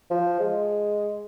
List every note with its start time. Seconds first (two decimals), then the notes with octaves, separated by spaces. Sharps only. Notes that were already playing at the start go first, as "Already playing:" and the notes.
0.10 F3
0.39 G#3